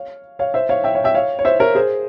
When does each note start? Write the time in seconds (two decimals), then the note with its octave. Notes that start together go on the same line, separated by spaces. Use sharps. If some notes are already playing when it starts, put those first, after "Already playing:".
Already playing: C#5 F5
0.39 C#5 F5
0.54 C5 E5
0.69 C#5 F5
0.84 E5 G5
0.95 C#5 F5
1.04 E5 G5
1.14 C#5 F5
1.39 C#5
1.45 C5 E5
1.59 A#4 C#5
1.75 G#4 C5